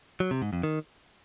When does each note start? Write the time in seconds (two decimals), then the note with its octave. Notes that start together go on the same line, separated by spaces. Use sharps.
0.20 F#3
0.31 C3
0.42 G#2
0.53 F2
0.63 D#3